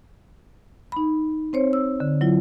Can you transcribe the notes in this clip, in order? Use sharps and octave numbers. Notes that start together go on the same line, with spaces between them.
D#4 B5
C4 C5 C#5
E6
D3
F#3 E4 F4